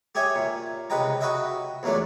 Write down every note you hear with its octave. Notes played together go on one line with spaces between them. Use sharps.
G4 G#4 C#5 E5 G#5
A#2
C#2 C3 B4 D#5 G5 A#5
F#4 B4 D#5 E5 G5
E2 A#2 F#3 A3 D4